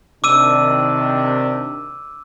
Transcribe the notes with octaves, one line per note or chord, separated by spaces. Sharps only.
C3 D#3 D4 D6 E6 D#7